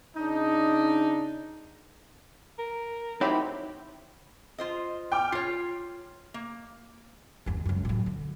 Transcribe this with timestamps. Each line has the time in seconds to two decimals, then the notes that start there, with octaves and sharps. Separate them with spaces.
0.16 C#3 D4 D#4
2.59 A#4
3.21 F#3 C4 D#4 E4 G4 C#5 B5
4.58 F4 C5 D#5
5.12 G5 D6 F6
5.32 F4 C#5 C7
6.34 A#3
7.46 G1 D#2
7.65 C#2 F#2
7.85 A2 F#3
8.06 D3